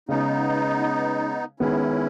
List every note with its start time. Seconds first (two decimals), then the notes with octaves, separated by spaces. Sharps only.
0.09 C#3 G#3 B3 C#4 D#4
1.60 D#3 G#3 B3 C#4 E4